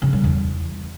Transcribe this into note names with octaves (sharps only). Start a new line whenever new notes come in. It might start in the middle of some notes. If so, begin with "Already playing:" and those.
C#3
G3
E2